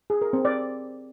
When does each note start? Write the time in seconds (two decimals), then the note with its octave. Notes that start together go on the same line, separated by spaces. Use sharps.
0.10 G#4
0.22 A#4
0.33 C4
0.45 D5